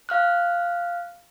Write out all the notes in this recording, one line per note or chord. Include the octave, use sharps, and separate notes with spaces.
F5 F6 F#6